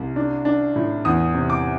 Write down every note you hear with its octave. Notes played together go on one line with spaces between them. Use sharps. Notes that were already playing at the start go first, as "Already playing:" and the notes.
Already playing: C2
D4
D4
A2
E2 D#6
C3
D6